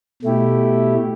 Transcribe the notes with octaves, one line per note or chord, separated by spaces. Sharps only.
B2 A3 E4 G4